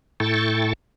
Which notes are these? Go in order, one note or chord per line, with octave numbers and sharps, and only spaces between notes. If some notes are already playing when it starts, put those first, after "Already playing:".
A2 E4 A4 G5 C#6 A6